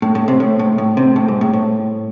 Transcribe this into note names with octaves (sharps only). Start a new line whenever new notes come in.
A2
A2
C3
A2
A2
A2
C3
A2
G#2
A2
A2